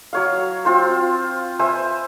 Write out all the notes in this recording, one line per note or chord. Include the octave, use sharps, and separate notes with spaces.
F#3 C#5 F5
C4 F4 C5
B4 C5 E5 G#5